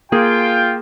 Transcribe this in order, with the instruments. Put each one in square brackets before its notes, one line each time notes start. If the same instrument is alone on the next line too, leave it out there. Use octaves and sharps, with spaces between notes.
[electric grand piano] A#3 [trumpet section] F4 G5 [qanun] G#4